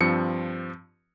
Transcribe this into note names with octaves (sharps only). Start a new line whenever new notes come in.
G2 F3 C4 C#7